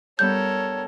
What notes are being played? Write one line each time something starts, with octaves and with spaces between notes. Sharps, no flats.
G2 G3 B3 A4 A#4 C#5 G6